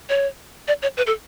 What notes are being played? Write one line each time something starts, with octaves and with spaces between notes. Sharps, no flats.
C#5
D5
C#5
B4
A4